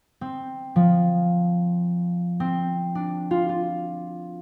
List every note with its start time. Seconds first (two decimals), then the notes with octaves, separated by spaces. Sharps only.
0.21 C4
0.76 F3
2.40 C4
2.95 D4
3.31 F4
3.49 F4